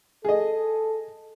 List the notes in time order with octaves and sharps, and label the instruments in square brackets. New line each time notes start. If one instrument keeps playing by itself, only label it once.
[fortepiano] G#4 D#5 [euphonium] A4